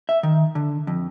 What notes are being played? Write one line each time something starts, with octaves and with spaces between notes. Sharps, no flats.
E5
D#3
D3
F2